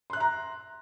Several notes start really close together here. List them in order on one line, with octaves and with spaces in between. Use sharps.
C6 F#6 E5 A#5